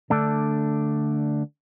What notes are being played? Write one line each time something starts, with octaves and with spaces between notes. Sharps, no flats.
D3 A3 D4